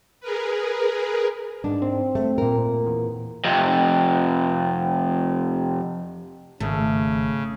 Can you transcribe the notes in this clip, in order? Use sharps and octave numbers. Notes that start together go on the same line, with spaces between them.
G#4 A#4 B4
G#2 D4
C4
A3
A#2 A#4
E2
F2 C3
G#1 C#3 A3